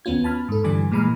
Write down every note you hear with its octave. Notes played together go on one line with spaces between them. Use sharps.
D#2 B3 C#4 F4 G#6
A5 B5 F6
G#2 A4
G2 D3 E3 G3 D4 G#5
A#2 E3 G#3 A#5 B5 F6